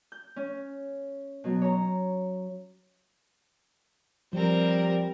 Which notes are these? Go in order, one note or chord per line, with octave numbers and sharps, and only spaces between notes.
G6
C#4
B2 F#3 B3
C#5 A#5
F3 G3 C4 A#4